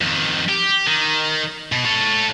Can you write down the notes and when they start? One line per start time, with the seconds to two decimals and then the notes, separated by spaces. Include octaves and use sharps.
0.01 F2 D#3
0.49 G4
0.87 D#3
1.72 B2
1.85 A4 C#5